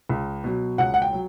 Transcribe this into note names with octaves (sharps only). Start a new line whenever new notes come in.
C#2
B2 F#3
C#2 F#5
F#5
G5
F#3